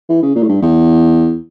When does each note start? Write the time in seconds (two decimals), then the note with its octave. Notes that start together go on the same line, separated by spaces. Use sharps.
0.09 E3
0.22 C#3
0.35 A#2
0.43 A2
0.49 G2
0.62 E2